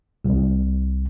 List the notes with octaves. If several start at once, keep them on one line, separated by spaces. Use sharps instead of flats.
C2